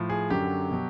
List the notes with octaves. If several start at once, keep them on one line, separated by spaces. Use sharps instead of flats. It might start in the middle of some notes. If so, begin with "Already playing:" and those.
Already playing: A2 F3
G#4
F#2 D3 F#3 G4
B2 F#3